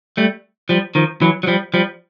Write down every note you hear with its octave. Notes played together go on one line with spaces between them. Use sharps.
G3 A3
F3 G3
D#3 F3
E3 F#3
F#3
F3 G3
F3 G3